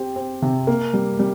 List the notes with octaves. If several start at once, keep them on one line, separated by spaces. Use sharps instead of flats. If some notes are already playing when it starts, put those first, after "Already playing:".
Already playing: C4 G4
C4
C3
A#3
G3
G3